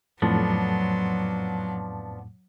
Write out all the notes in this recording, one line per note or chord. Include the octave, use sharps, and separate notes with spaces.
F2 A2 F3 F#3 B3 D4